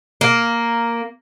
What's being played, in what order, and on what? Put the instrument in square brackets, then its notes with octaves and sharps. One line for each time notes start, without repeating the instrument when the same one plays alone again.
[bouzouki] A#3